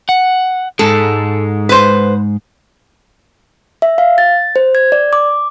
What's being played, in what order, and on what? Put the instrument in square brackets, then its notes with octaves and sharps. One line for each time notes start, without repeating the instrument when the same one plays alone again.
[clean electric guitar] F#5
[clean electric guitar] G#2 G#3 [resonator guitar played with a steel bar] A4
[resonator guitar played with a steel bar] B4 C5
[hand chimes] E5
F5
A6
C5
G#6
D5
D6